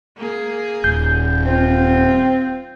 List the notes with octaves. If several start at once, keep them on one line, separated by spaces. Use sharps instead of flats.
A#3 G#4
D#1 G6
C4 F4